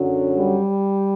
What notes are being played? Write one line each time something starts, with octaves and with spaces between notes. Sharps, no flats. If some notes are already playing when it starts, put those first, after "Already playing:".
Already playing: F#2 D3 F#3
G3